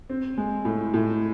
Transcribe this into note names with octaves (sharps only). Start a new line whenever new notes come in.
C4
G#3
A2
A2